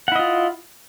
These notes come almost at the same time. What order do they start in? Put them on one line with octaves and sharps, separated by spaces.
F#5 E4 D#5 F4